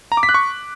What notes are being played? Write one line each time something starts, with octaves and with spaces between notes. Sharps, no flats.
A#5
D6
B6
F#6
C#6